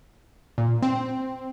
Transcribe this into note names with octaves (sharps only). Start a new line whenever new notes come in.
A#2
C4